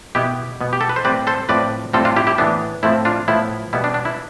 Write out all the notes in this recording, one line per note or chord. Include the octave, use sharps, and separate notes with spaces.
B2 B3 E4 G4
B2 B3
G4
A4
B4
C5
A2 G3 C4 B4 D5
A4 C5
A2 F3 C4 B4 D5
A2 G3 C4 F4 A4
D4 F4
E4 G4
E4 G4
A2 E3 B3 D4
A2 F3 A3 C4 E4
D4 F4
A2 F3 B3 E4
B2 G3 B3 E4
D4
D4
E4